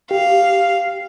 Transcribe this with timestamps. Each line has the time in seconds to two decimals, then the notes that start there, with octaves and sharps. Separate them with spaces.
0.11 G4 F5